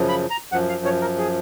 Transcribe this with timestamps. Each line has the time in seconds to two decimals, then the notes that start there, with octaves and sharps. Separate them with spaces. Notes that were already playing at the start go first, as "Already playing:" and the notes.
Already playing: F#2 C#3 F3
0.09 B5
0.30 A#5
0.52 F#2 F3 F#5
0.69 F5
0.85 C#5
1.01 A#4
1.18 G#4